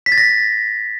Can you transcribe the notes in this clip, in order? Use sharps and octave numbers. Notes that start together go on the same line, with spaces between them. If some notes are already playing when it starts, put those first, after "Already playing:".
B6
A6
A#6